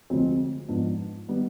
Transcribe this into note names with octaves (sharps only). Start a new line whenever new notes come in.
D2 C3 F3 G#3 C4
G#2 F3 B3 D4
D#3 G3 B3